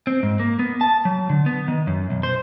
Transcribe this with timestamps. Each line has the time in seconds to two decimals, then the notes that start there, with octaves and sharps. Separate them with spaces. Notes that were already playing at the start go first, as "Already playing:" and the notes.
0.07 C4
0.23 G#2
0.40 A#3
0.59 B3
0.81 A5
1.05 F#3
1.30 D3
1.46 B3
1.68 D#3
1.87 F#2
2.10 B1
2.23 C5